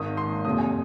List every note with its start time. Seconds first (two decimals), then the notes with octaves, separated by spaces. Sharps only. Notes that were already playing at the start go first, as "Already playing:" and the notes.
Already playing: G#1 G#2 D#3 D#6
0.17 C6
0.45 F#1 F2 C3 D#6
0.58 G#5